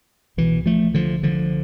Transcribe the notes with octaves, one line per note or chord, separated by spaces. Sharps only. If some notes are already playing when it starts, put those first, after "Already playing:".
C2 B2 E3
F3 A3
D3 F3
D3 F3